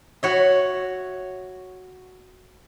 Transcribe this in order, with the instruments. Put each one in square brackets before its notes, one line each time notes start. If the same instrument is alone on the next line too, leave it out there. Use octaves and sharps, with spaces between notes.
[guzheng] F#4 C#5 E5